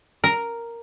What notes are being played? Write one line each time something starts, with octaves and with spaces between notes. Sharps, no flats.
A#4